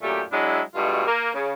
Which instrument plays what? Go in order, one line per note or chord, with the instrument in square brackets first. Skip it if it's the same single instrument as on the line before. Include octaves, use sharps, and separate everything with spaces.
[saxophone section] F#2 A#2 A3 G4
F#3 G#3 D4 E4
G2 B2 G#3 A3 F4
A#3
C#3